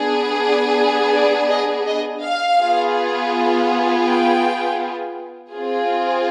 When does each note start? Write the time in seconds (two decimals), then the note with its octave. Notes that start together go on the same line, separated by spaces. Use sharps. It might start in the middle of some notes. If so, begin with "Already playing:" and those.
Already playing: B3 D4 G#4
0.40 D5
1.13 D5
1.50 D#5
1.86 D#5
2.23 F5
2.59 B3 F4 G#4
4.06 G5
5.52 C4 F4 G#4